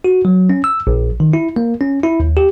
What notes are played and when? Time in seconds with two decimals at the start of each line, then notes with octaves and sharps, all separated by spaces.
0.04 F#4
0.25 F#3
0.50 C#4
0.64 E6
0.87 A#1
1.20 D#3
1.33 E4
1.56 A#3
1.81 C#4
2.03 E4
2.20 D#2
2.37 G4